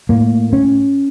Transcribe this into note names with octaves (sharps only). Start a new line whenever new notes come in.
A2 A#3
C#4